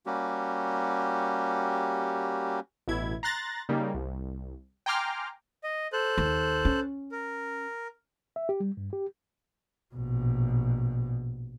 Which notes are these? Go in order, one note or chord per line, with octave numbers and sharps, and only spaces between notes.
G3 A#3 C#4 F#4 G4
A1 B2 E4 G#6
A#5 C6 F#6 A6 A#6
C#3 G3 A#3 D#4
C2
G5 G#5 A#5 C6 D6 F6
D#5
A4 C5 F#6
D#2
C#4
A#4
E5
G4
G3
G2
G4
A#1 B2